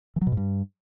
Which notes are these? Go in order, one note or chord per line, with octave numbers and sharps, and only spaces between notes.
E3
F#3
B2
G#2
G2